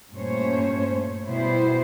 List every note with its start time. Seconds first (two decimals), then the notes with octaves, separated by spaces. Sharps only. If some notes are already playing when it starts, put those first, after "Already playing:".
0.13 G2 A#2 A3 C#4 C5 C#5
1.27 B2 G3 B3 E4 C5